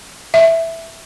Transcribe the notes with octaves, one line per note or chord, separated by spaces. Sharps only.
E5